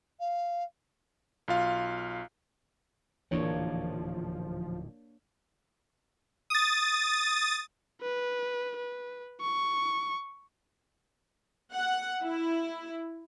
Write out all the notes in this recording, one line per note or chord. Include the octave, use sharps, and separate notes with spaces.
F5
B1 F4 F5
D1 D#2 A#2 E3 F3 A#3 D4 C#5
D#6 A6
B4
B4
C#6
F#5
E4